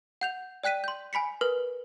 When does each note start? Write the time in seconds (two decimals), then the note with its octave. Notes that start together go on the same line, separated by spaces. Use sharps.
0.21 F#5 G6 F7
0.63 D5 G5 F#6 B6 D#7
0.84 C6 G6
1.13 G#5 B5 B6 C#7
1.41 A#4 B4 F6